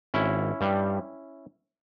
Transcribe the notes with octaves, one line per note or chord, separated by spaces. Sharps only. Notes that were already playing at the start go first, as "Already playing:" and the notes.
G#1 C#4 E4
G2 G3